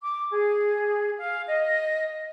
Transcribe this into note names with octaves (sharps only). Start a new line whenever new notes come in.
D6
G#4
F5
D#5